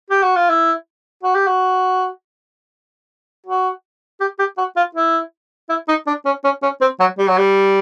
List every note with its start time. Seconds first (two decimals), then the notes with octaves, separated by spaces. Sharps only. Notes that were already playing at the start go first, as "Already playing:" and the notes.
0.10 G4
0.23 F#4
0.36 F4
0.49 E4
1.23 F#4
1.35 G4
1.47 F#4
3.47 F#4
4.21 G4
4.39 G4
4.58 F#4
4.76 F4
4.95 E4
5.70 E4
5.88 D#4
6.07 D4
6.25 C#4
6.44 C#4
6.63 C#4
6.81 C4
7.00 F#3
7.19 G3
7.28 F#3
7.38 G3